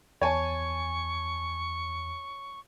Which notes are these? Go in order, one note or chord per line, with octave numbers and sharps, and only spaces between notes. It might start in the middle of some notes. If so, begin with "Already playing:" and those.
E2 C#5 G#5 A5 C#6